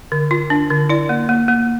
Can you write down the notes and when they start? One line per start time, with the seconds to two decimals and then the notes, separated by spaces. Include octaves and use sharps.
0.12 D3
0.31 F4
0.50 D4
0.70 D3
0.89 E4 D5
1.09 A#3
1.29 A#3
1.48 A#3